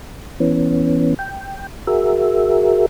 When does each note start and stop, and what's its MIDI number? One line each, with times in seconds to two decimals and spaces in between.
0.40 1.14 52
0.40 1.14 59
0.40 1.14 61
1.19 1.67 79
1.87 2.86 66
1.87 2.86 68
1.87 2.86 70
1.87 2.86 76